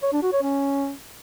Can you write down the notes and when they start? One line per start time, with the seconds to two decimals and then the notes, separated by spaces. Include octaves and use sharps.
0.02 C#5
0.12 D4
0.22 F#4
0.32 C#5
0.43 C#4